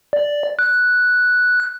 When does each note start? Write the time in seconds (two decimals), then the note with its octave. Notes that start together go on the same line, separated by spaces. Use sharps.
0.13 D5
0.59 F#6